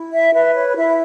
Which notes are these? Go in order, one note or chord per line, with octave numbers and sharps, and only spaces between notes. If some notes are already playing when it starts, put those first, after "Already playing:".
Already playing: E4
E5
B4 E5
C#5
E4 E5